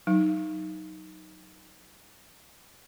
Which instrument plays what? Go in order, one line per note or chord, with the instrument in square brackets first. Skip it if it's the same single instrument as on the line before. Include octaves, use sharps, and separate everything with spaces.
[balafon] F#3 D#4